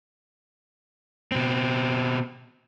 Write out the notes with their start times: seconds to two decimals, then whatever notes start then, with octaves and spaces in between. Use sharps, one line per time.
1.32 B2 C4